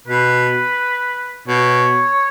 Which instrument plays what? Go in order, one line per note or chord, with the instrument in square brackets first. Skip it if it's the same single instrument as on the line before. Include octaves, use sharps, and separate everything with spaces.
[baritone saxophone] B2 [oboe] B4
[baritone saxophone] B2 [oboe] C#5